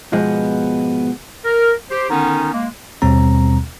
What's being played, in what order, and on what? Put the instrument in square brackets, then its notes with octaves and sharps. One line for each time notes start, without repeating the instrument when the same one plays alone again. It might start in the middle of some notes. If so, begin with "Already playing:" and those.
[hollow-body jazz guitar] G#2 B2 F3 G#3 B3
[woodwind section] A#4
G4 C5
D3 D#3 B3 C#4 D#4
G#3 A#3
[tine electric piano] D#2 B2 G3 C4 A#5